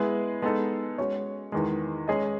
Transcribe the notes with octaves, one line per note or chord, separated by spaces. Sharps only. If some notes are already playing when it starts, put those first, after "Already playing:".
Already playing: G#3 B3 E4 G#4 B4
G#3 B3 D#4 A4
G#3 C#4 F#4 C#5
E2 D#3 G#3
G#3 C#4 G#4 D#5